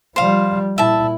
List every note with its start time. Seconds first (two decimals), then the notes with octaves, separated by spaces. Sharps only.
0.16 F3 G3 C5 F5
0.78 A#2 E4 E5 A5